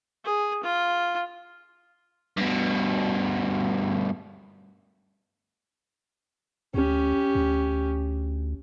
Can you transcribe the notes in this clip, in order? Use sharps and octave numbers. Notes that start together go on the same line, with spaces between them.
G#4
F4
G2 B2
D2 C#4 G4
D2